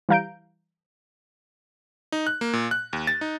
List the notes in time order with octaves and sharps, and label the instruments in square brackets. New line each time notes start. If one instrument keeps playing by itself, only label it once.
[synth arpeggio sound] E3 G3 F5 A#5 G6 D7
[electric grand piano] D#4
F#6
A#3
A#2
F#6
D#2
A6
D#4